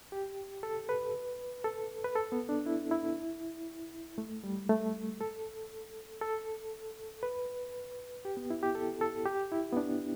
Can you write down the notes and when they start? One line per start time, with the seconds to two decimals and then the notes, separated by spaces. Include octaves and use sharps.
0.12 G4
0.63 A4
0.89 B4
1.64 A4
2.04 B4
2.15 A4
2.32 B3
2.49 D4
2.66 E4
2.91 E4
4.18 A3
4.44 G3
4.69 A3
5.21 A4
6.21 A4
7.23 B4
8.25 G4
8.37 B3
8.50 E4
8.63 G4
8.75 A4
9.01 A4
9.26 G4
9.52 E4
9.73 B3
9.77 D4